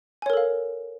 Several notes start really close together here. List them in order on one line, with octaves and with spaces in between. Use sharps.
G#5 C#5 A#4 A4 F5